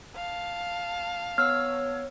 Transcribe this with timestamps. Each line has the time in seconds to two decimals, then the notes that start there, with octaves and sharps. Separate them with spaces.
0.15 F5 A5
1.38 B3 C#5 E6 F6